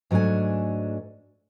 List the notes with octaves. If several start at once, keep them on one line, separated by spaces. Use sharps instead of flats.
G#2 F#3 A3 D4 G#5